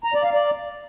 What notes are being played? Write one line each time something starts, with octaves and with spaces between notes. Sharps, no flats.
A#5
D5
F5
D5